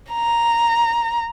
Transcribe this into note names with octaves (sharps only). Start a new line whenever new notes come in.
A#5